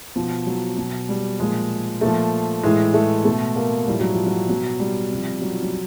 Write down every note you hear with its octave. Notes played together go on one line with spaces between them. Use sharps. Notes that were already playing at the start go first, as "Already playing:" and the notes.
B2 F3
F#3
B2
G3
A#2 F3 G#3
A#2 F3 A3
A2 E3 G#3
A3
B2 A3
A#3
A2 F3 G3
F#3
F3
F#3
B2 F#3
G3
C3 F3
F#3
F3
F#3